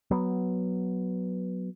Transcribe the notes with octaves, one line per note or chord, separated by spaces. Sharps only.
F#3 B3